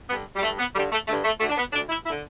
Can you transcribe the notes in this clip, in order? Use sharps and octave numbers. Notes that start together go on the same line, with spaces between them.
G2 D3 B3
G3
G2 D3 A3
B3
G2 D3 G3
A3
G2 D3 A3
A3
D2 D3 A3
D4
B3
D2 D3 D4
E4
E4
D3